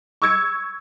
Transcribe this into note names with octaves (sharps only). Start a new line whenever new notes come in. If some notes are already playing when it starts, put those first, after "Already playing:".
C#6 E6 G#6 C#7